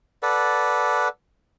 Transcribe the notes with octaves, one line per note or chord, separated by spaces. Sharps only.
A4 B4 D5 F#5